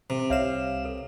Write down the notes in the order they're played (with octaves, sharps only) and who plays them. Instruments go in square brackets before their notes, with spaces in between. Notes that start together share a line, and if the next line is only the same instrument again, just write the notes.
[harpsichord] C3
[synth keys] C2 F5 E7 [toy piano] C#5 E5
[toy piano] A4 B4